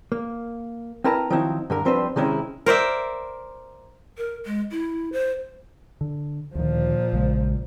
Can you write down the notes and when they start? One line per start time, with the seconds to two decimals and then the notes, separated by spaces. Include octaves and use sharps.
0.12 A#3
1.04 C4 E4 A#4 B4 A5 A#5
1.30 D#3 F3 F#3 C4 D#4 E4
1.70 G2 D3 A#4
1.85 F3 G3 C4 D4 B4 C5
2.16 C3 D#3 G#3 C4 C#4 E4
2.66 A#4 C5 D5 E5
4.17 A#4
4.46 G#3
4.71 E4
5.12 C5
6.01 D3
6.55 D2 A#2 D#3 F3
7.13 A#1 C#3 G#3